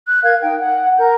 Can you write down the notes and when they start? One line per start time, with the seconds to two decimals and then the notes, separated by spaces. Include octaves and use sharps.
0.06 F#6
0.24 A#4 F5 G#6
0.41 D#4 G5
0.59 F#5
0.98 A#4 G6